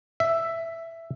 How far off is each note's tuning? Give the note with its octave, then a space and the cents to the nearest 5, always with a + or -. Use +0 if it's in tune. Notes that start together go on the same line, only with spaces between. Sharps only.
E5 +5